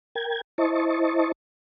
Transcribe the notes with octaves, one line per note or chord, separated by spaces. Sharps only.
A#4 G5 G#6
E4 C5 D#5 A5 C#6